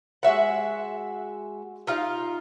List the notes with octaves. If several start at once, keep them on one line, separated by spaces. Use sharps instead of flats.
G#3 F#4 E5 F#5
D#4 F4 F5